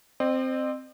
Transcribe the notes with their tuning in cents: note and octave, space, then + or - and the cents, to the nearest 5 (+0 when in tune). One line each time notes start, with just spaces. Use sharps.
C4 +0 D#5 -45